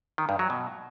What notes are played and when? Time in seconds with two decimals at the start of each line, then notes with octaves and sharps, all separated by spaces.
0.18 D#3
0.29 G2
0.39 F#3
0.50 B2